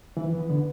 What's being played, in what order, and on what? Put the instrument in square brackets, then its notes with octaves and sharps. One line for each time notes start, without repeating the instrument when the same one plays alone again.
[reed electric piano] E3 [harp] B4
[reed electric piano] E3 [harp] B3
[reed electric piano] D3 [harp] B3